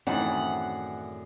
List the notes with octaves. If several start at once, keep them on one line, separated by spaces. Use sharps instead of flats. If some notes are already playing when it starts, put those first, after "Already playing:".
F#2 A2 D#3 E3 C4 G#4 D5 F#5